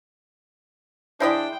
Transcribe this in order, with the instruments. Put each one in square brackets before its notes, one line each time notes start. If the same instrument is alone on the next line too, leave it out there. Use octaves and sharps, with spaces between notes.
[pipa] G#3 E4 D5 [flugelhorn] D4 [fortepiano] C5 D#6 [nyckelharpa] G5